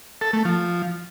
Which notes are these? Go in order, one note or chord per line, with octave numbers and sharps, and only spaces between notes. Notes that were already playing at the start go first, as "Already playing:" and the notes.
A4
A3
F3